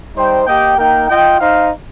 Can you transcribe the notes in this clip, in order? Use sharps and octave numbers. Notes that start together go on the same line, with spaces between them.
G3 D#4 C5 G5
A#3 G4 D#5 G5
A#3 D#4 A#4 G5
F4 D#5 G5
D#4 C5 F5